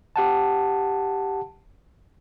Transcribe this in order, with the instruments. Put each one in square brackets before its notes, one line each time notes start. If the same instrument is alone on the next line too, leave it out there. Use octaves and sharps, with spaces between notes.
[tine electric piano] G4 F#5 A5